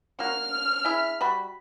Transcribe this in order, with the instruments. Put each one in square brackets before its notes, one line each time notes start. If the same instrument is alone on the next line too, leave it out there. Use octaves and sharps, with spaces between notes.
[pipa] A#3 F#4 [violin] F6
[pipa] E4 G#4 E5
G3 F#4 B5